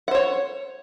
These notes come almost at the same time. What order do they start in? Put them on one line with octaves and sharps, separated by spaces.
F#5 C5 C#5